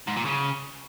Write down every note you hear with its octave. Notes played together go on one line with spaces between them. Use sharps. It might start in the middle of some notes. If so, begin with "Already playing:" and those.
G#2
A#2
C#3